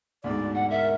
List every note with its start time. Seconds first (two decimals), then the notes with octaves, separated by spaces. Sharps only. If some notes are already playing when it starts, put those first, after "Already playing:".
0.24 D2 G#2 B2 D5
0.55 F#5
0.70 A#4 E5